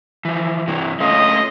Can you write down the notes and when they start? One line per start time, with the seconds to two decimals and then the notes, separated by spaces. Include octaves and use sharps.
0.25 E3 F3
0.67 G2 C3 E3
1.00 A3 C#4 F4 D#5